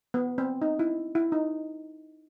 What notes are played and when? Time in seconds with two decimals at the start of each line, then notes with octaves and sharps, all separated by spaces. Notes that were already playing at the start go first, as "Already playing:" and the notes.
0.14 B3
0.38 C4
0.62 D#4
0.79 E4
1.15 E4
1.32 D#4